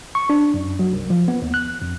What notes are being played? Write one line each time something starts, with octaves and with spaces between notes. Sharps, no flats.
C#6
D4
F#2
F#3
C2
F3
B3
D#2
F#6
F2